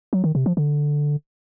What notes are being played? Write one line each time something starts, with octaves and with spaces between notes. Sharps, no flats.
F#3
D#3
C3
F3
D3